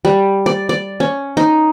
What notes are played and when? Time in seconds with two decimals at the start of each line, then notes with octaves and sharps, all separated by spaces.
0.05 G3
0.46 D5
0.69 D5
1.00 C#4
1.37 D#4